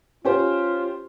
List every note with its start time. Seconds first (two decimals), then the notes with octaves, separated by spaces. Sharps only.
0.25 C#4 F4 G4 C5